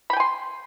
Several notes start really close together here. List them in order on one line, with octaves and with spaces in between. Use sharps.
B5 G5 G#5 C6